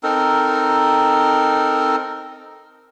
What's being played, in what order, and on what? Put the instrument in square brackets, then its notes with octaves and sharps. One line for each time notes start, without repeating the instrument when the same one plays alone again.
[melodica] C4 D#4 A4 A#4